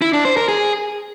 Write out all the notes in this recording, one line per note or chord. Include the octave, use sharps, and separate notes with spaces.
E4
D4
C5
A#4
G#4